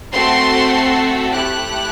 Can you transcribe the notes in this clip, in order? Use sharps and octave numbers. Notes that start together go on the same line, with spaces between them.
A3 C4 F#4 A4 C6
A3 E4 G4 F#6